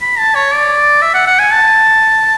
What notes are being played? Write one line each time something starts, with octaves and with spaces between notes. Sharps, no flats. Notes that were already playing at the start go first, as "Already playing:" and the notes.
B5
A5
C#5
D5
E5
F#5
F#5
G#5
A5